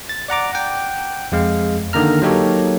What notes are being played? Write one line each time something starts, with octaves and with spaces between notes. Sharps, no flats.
A6
D5 F#5 A#5 D6
F#5 G5
F2 G#3 F5
D3 D#3 A#3 A#5 F6
F#3 A#3 D#4 G4 A4 C#5